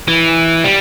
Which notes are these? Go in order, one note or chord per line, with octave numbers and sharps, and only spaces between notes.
E3
G3